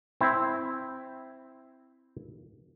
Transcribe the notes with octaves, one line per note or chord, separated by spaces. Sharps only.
C4 E4